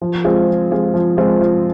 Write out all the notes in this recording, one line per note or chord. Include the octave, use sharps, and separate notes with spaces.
F3
G#3 C4 F4 G#4
F3
G#3 C4 F4 G#4
F3
G#3 C4 F4 G#4
F3